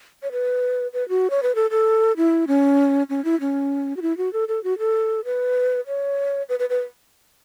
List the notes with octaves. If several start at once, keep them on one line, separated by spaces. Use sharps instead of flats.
C#5
B4
B4
F#4
C#5
B4
A4
A4
E4
C#4
C#4
E4
C#4
F#4
E4
F#4
A4
A4
F#4
A4
B4
C#5
B4
B4
B4